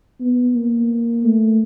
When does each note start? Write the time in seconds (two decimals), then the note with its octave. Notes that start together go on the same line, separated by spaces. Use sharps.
0.21 B3
0.56 A#3
1.25 A3